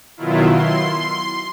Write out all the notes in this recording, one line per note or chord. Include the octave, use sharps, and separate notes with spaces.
B2 D#3 F#3 E4 F4
C6